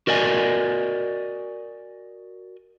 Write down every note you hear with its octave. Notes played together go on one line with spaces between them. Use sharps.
F#4 A#4 D5 D#5 G#5